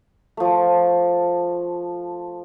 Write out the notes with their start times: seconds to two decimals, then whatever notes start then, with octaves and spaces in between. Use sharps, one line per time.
0.37 F3 A3